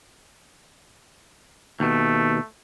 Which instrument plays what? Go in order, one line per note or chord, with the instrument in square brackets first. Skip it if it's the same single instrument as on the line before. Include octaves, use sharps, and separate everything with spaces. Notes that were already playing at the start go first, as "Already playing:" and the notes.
[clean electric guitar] D#2 B2 [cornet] A3